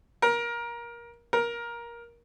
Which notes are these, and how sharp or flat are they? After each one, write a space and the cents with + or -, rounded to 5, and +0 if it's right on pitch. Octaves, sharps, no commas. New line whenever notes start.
A#4 +20
A#4 +15